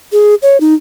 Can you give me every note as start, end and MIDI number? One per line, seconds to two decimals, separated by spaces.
0.12 0.35 68
0.42 0.60 73
0.60 0.74 63